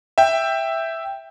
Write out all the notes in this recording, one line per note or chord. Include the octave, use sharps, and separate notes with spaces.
E5 G5